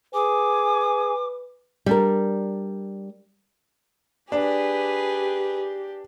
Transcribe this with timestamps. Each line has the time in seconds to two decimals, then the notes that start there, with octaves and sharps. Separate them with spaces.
0.14 G#4 B4 G#5 D6
1.86 G3 D4 A#4
4.32 D4 G4 G#4 B4